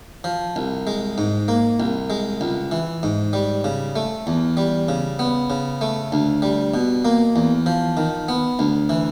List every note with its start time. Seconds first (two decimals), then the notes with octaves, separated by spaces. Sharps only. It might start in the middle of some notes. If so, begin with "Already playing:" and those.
0.24 F3
0.56 C2
0.87 G#3
1.18 G#2
1.48 A#3
1.80 C2
2.10 G#3
2.41 C#2
2.71 E3
3.03 G#2
3.33 G3
3.64 C#3
3.96 A3
4.27 E2
4.57 G3
4.88 C#3
5.19 B3
5.50 C#3
5.81 A3
6.12 D2
6.42 G3
6.74 B2
7.05 A#3
7.36 E2
7.66 F3
7.97 D#3
8.29 B3
8.59 D2
8.89 E3